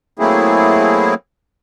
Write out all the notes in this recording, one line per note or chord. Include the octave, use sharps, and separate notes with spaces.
F#3 A3 A#3 C4 E4 G#4